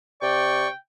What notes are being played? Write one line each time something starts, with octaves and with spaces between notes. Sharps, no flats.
C3 D5 G5 C#6